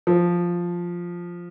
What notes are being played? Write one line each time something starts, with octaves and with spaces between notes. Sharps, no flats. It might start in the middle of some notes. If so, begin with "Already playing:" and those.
F3